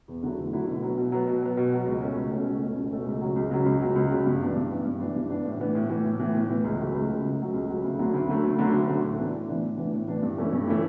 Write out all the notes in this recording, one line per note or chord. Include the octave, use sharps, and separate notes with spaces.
E2
D3 F#3 A3 E4
E2
D3 F#3 A3 E4
B2
F#3 B3
B2
F#3 B3
B2
F#3 B3
B2
F#3 B3
C#2
B2 A3 C#4
C#2
B2 A3 C#4
C#2
B2 A3 C#4
C#2
B2 A3 C#4
C#2
C#3 F#3
C#2
C#3 F#3
C#2
C#3 F#3
C#2
C#3 F#3
G2
E3 B3 D4
G2
E3 B3 D4
G2
E3 B3 D4
G2
E3 B3 D4
A2
E3 B3
A2
E3 B3
A2
E3 B3
A2
E3 B3
C#2
C#3 F#3 A3
C#2
C#3 F#3 A3
C#2
C#3 F#3 A3
C#2
C#3 F#3 A3
D2
D3 F#3 A3
D2
D3 F#3 A3
D2
D3 F#3 A3
D2
D3 F#3 A3
A2
E3 B3 D4
A2
E3 B3 D4
A2
E3 B3 D4
A2
E3 B3 D4
G2
E3 A3 C#4 E4
G2
E3 A3 C#4 E4